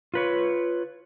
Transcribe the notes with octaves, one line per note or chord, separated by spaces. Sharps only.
F4 B4 C#5